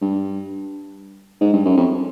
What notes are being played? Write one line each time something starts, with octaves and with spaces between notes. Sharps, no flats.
G2
G#2
G2
F#2
F2